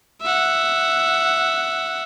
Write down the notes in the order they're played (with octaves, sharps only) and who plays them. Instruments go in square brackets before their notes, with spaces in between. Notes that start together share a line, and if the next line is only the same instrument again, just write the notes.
[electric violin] E5 F#5